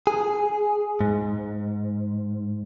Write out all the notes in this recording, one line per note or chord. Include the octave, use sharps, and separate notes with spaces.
G#4
G#2